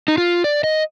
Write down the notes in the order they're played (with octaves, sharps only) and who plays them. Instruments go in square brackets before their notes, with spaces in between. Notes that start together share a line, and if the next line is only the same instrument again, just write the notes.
[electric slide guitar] D#4
F4
D5
D#5